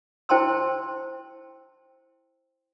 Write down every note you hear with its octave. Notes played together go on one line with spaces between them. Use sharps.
E4 C5 G5 A5 C6 E6